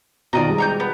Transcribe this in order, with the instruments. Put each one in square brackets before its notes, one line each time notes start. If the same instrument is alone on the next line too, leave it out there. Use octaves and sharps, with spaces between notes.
[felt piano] B2 D#3 F4 [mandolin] D5 D#5 A#5
[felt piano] G3 G#3
[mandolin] A#5 C#6 G6
B3